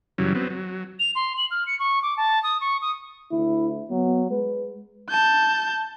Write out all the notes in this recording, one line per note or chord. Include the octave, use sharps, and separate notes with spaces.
F#2 C#3 E3 F#3 G3
F#3 B3 C4
F#3
F7
C6
F#7
F6
C#7
C#6
D6
A5
D#6
C#6
D#6
D2 E4
F#3 B3
G#3 B4
A5 G6